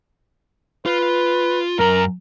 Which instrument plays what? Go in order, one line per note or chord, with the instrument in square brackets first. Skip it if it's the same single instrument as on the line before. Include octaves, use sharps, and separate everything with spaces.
[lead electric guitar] F4 [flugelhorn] B4
[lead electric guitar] F#2 A#5 [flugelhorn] A#4